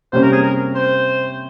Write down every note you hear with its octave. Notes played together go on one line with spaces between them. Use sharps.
C3 G3 A#3 C#4 C5
A#4
G#4
A#4
C5